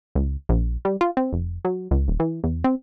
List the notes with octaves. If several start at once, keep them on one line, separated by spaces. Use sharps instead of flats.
C#2
A#1
G3
F4
C4
F1
F#3
C#2
D#1
E3
E2
C4